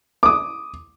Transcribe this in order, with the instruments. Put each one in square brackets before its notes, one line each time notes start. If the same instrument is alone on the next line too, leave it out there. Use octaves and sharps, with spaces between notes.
[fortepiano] D6 D#6